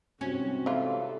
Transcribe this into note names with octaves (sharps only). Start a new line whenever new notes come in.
G#2 C3 C#4 F#4
E3 F4 A4